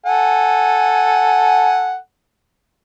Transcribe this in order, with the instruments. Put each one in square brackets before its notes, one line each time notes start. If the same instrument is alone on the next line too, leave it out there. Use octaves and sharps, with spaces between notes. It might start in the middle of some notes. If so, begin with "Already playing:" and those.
[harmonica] A4 F#5 G#5